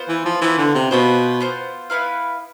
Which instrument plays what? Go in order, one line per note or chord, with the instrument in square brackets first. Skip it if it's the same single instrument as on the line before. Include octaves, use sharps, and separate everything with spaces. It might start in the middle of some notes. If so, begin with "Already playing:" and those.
Already playing: [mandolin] B3 F4 C5
[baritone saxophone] E3
F3
[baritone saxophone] E3 [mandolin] B3 F4 C5
[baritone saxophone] D3
C3
[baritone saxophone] B2 [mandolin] B3 F4 C5
[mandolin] B3 F4 C5
B3 E4 B4 F5